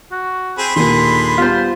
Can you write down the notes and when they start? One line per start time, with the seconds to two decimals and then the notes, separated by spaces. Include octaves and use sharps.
0.12 F#4
0.58 C4 G#4 B5
0.76 D#2 A#2 D3 G#4 C6
1.38 G3 B3 F4 G4 C5